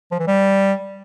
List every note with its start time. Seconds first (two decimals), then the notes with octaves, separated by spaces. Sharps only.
0.11 F3
0.19 E3
0.27 G3